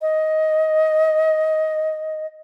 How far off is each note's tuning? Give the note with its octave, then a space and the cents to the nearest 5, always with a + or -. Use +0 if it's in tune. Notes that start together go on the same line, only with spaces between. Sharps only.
D#5 +15